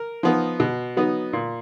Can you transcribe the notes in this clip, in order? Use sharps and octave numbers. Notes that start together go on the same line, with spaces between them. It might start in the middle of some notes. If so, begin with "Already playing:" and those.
Already playing: A#4
F3 B3 D#4
B2
F#3 B3 D#4
A#2